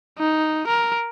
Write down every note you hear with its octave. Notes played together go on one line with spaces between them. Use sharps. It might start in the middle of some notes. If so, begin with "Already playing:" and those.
D#4
A#4